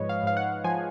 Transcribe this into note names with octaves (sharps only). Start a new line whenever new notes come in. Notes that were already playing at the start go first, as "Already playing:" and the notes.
Already playing: G#2 F3 G#3 B4 C#5 D#5
F5
G#2 F5
F#5
F3 G#5